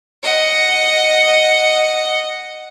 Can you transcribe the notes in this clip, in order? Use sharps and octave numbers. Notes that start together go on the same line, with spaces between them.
D#5 F#5